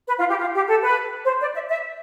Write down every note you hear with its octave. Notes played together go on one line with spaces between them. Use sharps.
B4
F4
G4
F4
G4
A4
B4
C5
D5
E5
E5